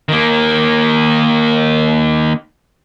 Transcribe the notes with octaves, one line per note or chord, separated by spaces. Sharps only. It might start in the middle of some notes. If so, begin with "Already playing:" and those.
D#3 A#3